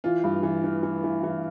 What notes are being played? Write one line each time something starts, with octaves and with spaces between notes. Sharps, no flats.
E3 F4
G2
E3
E3
E3
E3
E3